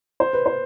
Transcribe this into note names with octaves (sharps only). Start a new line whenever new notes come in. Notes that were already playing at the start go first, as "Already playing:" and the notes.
C5
B4
C5